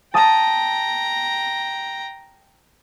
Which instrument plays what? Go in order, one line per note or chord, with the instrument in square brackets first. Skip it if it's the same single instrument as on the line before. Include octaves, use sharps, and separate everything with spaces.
[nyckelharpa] G5 A#5 [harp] A5 D#6